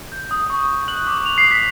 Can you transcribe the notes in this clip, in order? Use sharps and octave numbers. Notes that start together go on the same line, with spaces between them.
G6
D#6
C#6
C#6
F#6 F#7
D6
D6 F7
C7
D6
B6